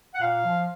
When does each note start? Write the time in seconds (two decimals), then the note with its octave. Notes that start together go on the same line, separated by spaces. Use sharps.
0.15 F#5
0.21 A#2 F5
0.45 F3